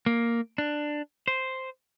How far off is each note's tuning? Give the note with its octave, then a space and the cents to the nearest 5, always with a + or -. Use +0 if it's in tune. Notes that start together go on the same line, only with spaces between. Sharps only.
A#3 +0
D4 +10
C5 +0